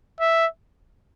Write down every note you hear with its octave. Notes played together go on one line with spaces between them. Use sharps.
E5